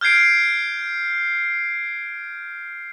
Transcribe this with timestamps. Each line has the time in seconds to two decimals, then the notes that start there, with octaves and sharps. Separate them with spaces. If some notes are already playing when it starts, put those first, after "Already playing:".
0.01 F6 G6 G#6 C7 D7